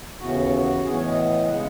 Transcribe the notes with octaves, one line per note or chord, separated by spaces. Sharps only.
D#2 C#3 E3 B3 F#4
A2 E3 B3 G#4
C#5
D#5
C#3 G#3 B3 F#5